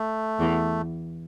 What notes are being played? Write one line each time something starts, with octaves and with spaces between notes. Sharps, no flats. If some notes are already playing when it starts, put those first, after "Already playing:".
Already playing: A3
E2 E3